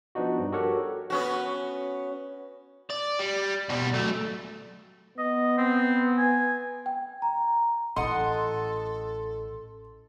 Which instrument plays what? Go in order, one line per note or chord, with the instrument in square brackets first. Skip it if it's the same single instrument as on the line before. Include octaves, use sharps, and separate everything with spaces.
[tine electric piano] F3 B3 D4 D#4 F#4
G2
F#4 G4 A4 A#4 C#5 F#5
[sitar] B3 C#4 F#4
[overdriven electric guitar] D5
G3
B2 G3
F#3 A3
[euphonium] B3 [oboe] D#5
[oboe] C4
G#5
[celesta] G5
A#5
[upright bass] A1 [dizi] A4 [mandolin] D#5 F#5 [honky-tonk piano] C6